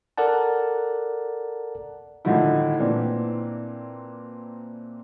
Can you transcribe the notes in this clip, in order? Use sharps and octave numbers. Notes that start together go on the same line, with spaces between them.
A4 A#4 D5 F#5 A5
A2 D3 D#3 F3 D#4 E4
A#2 E3 C4 D4